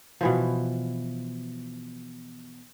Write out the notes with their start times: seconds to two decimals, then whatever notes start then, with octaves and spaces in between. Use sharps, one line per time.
0.21 B2 E3 F3